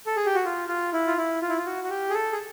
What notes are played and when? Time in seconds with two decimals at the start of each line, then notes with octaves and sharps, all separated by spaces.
0.06 A4
0.16 G#4
0.26 G4
0.35 F#4
0.45 F4
0.68 F4
0.93 E4
1.07 F4
1.17 E4
1.42 F4
1.49 E4
1.58 F4
1.66 F#4
1.84 F#4
1.90 G4
2.10 G#4
2.14 A4
2.32 G#4